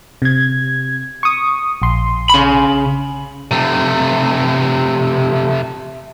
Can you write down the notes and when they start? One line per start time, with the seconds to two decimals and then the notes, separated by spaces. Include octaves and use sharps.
0.22 C3 G#6
1.23 C#6 D#6
1.82 A#1 C6
2.30 C#3 B5
3.51 C3 A3